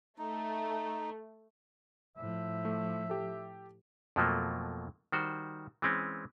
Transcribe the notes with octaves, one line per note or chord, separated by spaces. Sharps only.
A3 D#4
A2 F3 E5
A3
G4 A4
F2 B2 F3 F#3 A3 A#3
D#3 G3 F#4 C5
E3 G#3 C4 C#4